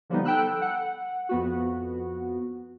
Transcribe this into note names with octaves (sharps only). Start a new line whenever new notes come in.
D3 F3 G3 B3 D#4
A4 G5 B5 E6 F#6
F#5
F2 B3 F#4